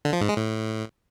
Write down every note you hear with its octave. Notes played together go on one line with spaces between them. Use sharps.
D3
F3
G#2
G#3
A2